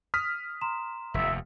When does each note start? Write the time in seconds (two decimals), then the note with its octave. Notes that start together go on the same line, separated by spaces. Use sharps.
0.14 D#6 F6 B6
0.61 A#5 C6 E7
1.14 F1 D#2 E5